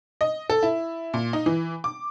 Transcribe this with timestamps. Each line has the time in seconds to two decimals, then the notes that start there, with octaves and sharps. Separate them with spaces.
0.21 D#5
0.50 A4
0.63 E4
1.14 A#2
1.33 D#4
1.46 E3
1.84 D6